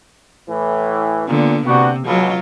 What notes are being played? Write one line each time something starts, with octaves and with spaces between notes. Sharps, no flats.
A2 E3
A#2 D3 A#3 B3
C3 B3 D4 F#4
C#2 B2 F#3 F4